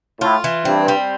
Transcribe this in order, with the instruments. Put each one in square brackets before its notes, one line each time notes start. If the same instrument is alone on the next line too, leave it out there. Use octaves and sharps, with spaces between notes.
[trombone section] A2 [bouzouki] F4
[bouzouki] E3
[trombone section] G2 [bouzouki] C4
[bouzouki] G3